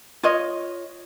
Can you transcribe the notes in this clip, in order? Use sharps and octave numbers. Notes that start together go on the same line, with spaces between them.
F4 C#5 D#5